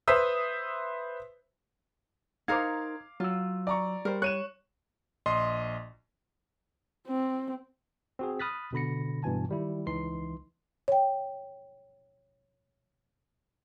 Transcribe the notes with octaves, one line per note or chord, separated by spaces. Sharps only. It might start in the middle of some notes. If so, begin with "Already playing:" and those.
B4 C5 E5 D#6 E6
D#4 A#4 C5 F5 D6 G#6
F#3 F4 E6
D5 A#5 C#6
G3 A#4 C5
C#5 F#6 D#7 E7
A#1 D#5 C6
C4
C4 F#4 G#4
B5 D#6 F6 F#6 A6 B6
B2 D3 B5 A#6 C#7
G2 B2 E3 G#5 A5
D#3 G3 E4
C#2 E3 D#4 C6 C7
C#5 G5